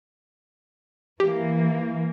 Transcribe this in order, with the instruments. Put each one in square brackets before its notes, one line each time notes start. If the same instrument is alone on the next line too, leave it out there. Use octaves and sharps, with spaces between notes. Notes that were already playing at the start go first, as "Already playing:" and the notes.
[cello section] E3 A#3 [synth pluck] G4